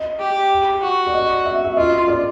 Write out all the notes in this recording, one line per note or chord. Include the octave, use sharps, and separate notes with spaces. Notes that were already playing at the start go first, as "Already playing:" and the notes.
Already playing: D#5
G4
F#4
D5
D#5
E5
E5
F4 D#5
D5